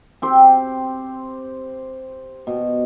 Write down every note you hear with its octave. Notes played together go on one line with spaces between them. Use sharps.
C4 G4 C5
B2